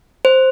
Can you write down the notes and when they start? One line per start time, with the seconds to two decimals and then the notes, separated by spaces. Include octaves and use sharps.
0.25 C5